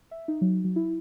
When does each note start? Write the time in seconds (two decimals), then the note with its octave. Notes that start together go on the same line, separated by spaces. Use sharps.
0.11 E5
0.28 D#4
0.41 F#3
0.65 F#3
0.76 E4